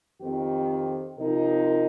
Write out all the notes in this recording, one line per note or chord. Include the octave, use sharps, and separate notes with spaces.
F2 D#3 C4 G4
C3 F3 D#4 A#4